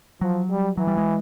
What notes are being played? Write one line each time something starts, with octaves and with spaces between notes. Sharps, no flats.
F3 F#3
G3
E3 F#3
G3
G#3